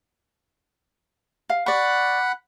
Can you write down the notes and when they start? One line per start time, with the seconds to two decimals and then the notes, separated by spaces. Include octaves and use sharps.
1.49 F5
1.66 D5 F#5 B5 C#6 F#6